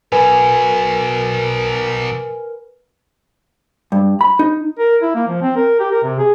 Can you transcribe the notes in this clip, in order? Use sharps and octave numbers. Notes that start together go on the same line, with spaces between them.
B2 F#3 A#4 B4 G#5
G2
B5
D#4
A#4
E4
A#3
F3
C4
A#4
G4
A#4
C3
G#4